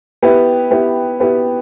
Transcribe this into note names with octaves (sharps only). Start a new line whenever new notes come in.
B3 E4 G4 B4
B3 E4 G4 B4
B3 E4 G4 B4